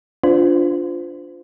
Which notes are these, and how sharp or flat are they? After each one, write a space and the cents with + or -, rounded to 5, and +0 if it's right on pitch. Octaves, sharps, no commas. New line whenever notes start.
D4 -15 F4 +0 C5 -30